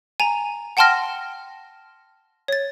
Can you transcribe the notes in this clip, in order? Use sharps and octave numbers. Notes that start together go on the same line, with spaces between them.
G#5 A#5
F#5 G5 A5 C6 F6 A#6
C#5 A6